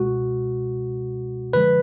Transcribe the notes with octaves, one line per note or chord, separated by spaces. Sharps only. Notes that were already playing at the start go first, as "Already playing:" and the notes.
Already playing: C#2 B2 G#3 F#4
F#2 D3 F3 G#3 B4